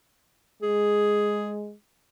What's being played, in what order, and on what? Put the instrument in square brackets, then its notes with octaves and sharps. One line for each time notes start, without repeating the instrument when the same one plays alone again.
[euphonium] G#3 [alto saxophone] G#4